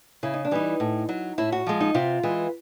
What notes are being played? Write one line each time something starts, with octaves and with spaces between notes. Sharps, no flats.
C#3 E4
D#4
D4
E3 G3 D#4
A2
F#3
A2 E4
F#4
F3 G#3
D#4
C3 F4
E3 G#3